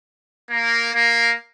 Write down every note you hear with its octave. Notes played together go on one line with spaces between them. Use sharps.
A#3
A#3